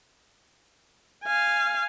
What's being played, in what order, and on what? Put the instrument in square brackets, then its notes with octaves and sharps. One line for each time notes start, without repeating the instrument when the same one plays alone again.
[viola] F5 G#5